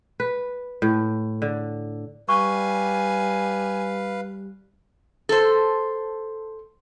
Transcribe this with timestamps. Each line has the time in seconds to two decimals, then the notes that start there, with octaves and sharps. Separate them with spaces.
0.20 B4
0.82 A2
1.42 D3
2.29 G3 B4 F5 G#5 C#6
5.29 A4 C5